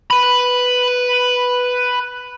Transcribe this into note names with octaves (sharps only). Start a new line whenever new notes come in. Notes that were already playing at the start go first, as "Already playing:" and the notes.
B4 B5